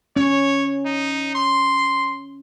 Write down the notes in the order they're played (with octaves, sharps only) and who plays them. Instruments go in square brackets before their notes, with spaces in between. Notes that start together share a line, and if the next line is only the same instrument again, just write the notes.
[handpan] C#4 [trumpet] C#5
[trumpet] D#4
C6